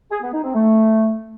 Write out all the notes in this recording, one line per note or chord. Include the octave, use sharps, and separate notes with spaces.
G#4
B3
D#4
C4
A3